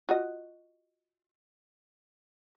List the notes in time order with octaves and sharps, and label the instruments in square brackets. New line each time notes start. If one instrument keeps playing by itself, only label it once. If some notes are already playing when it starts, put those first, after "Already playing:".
[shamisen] F4 F#4 D#5